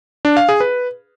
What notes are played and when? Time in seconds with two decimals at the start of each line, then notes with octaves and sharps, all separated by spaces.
0.25 D4
0.37 F5
0.49 G#4
0.60 B4